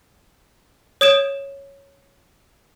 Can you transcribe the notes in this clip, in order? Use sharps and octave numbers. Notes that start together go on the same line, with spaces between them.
C#5 D#6 G#6 D7 E7